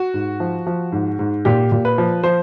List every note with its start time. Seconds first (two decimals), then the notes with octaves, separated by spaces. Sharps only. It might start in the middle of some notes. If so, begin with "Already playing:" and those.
Already playing: F#4
0.14 G#2
0.40 F3
0.67 F3
0.92 G#2
1.19 G#2
1.45 A#2 G4
1.72 A#2
1.85 B4
1.98 F3
2.24 F3 C5